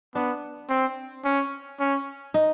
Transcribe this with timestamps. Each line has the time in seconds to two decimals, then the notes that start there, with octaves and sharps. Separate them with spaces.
0.15 B3 D4
0.70 C4
1.24 C#4
1.80 C#4
2.34 D#4